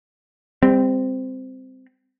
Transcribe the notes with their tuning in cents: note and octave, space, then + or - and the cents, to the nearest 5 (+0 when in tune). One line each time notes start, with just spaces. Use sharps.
G3 +30 C4 -15